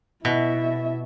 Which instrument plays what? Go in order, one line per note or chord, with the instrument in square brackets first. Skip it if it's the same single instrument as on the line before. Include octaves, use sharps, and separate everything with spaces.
[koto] B2 [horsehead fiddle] E4 E5